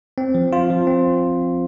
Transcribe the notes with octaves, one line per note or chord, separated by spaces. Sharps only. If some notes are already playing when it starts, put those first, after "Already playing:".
C4
F3
F4
F3
C4